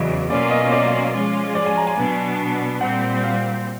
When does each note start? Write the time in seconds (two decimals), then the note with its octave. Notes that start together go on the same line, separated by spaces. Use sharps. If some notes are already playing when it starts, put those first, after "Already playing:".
Already playing: E2 C#3 F#3 B4 D5 D#5
0.30 B2 F#3 A#3 C#4 F4 D5
0.50 D#5
0.72 D5
1.13 F3 G#3 C#4 F4
1.55 D5
1.66 G#5
1.77 A#5
1.87 G#5
1.98 B2 F#3 B3 D4
2.81 A#2 G3 C4 F#5
3.23 F5